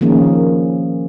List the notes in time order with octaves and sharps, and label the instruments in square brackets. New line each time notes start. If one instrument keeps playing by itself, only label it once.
[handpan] D#3 F3 A#3 C#4 G#4